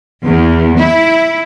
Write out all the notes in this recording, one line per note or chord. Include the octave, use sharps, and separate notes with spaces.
E2
E4